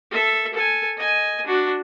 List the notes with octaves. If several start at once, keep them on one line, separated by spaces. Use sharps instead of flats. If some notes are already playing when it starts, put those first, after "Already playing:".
A4 E5
A4 G#5
D#5 G#5
D4 F#4